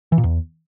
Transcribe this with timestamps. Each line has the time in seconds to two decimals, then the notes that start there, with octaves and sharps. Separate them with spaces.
0.12 E3
0.18 A#2
0.24 E2